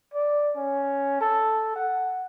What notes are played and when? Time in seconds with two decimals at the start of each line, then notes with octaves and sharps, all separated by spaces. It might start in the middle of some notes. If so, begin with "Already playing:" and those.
0.14 D5
0.56 C#4
1.21 A4
1.76 F#5